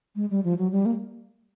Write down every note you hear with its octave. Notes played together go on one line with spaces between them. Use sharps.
G#3
G3
F3
F#3
G3
A#3